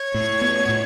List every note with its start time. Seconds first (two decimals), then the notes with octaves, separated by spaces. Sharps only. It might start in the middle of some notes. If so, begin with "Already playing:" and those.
Already playing: C#5
0.14 A2
0.41 B3
0.69 A2